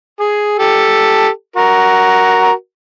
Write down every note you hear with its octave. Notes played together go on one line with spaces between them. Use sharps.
G#4
G4 A4
F#4 A#4